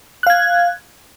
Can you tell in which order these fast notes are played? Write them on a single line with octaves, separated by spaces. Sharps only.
F#6 F5 G#6